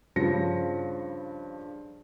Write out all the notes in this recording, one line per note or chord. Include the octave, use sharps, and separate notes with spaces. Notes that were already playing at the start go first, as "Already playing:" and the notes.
G2 C#3 F3 A#6 C#7